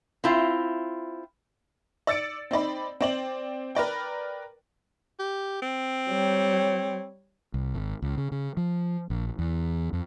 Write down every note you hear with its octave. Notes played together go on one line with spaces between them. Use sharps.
C4 E4 F4
D5 E6 A6 C#7 D7
C4 D#4 D5 B5
C4 D5 F#7
A#4 B4 D5 G5
G4
C4
G3 C#5
C2
G#1
C#2
C#3
C#3
F3
A#1
E2
F2